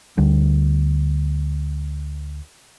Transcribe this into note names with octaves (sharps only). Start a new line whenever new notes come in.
D2 G3